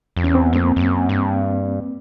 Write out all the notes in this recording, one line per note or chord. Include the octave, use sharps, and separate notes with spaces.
F2
E2 C#4
C4
B3
F2 A#3 C4
F2
F#2
G2